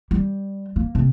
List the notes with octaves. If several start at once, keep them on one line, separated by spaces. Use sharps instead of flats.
G3
A#3
C3